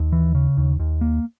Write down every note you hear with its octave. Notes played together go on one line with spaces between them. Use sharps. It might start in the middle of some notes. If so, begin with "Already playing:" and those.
Already playing: D#2
E3
C#3
D#2
D#2
A#3